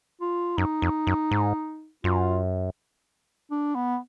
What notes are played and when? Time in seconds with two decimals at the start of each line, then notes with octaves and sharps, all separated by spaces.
0.21 F4
0.57 F#2 D#4
0.82 F2
1.07 F#2
1.31 G#2
2.04 F#2 F4
3.51 D4
3.75 B3